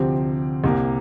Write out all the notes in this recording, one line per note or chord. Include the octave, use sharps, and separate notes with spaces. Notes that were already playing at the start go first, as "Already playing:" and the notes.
Already playing: D2 C3 F3 C4 G4
C2 C3 A#3